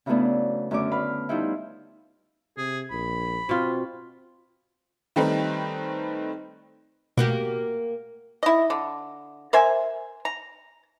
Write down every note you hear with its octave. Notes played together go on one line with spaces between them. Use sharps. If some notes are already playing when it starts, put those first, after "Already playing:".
C#3 E3 F#3 A3 B3 D4
F#2 D3 A3 C#4 D6
B4 F5 B5
F3 G3 D#4 E4
C3 G#4
A#1 B5
B2 C4 F4
D#3 G3 A3 C4 D#4 B4
B2 A#3 F#4 G4
E4 D#5
D3
A#4 C5 E5 G#5
A#5